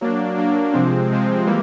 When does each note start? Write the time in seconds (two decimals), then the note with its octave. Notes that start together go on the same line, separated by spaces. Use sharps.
0.01 F#3 A#3 D4
0.38 F#3 A#3 D4
0.73 C3 F3 G#3 C4
1.11 C3 F3 G#3 C4
1.47 E3 G3 A#3